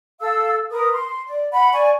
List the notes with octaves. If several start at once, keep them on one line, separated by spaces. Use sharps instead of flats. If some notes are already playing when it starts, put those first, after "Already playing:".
A4 F5 E6
A#4 B4 D#6
C6
D5
F#5 B5
D5 G#5 C#6